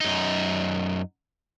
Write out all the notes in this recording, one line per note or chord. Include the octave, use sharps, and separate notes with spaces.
F#2 D#4